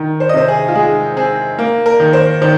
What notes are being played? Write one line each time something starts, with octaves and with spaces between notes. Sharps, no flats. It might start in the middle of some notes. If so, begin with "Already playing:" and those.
Already playing: D#3
C5
D#5
C3 C5
G#4
F4
G#3 G#4
C4 G#4
A#3
A#4
D#3
C5
D#3 C5